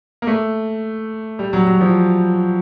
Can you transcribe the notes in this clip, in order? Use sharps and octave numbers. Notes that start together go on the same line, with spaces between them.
A#3
A3
G3
F#3
F#3
F3